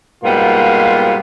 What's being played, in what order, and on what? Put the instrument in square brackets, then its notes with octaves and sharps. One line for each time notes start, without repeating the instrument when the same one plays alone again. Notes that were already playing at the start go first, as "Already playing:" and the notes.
[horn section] G#2 B2 G3 A#3 B3 F4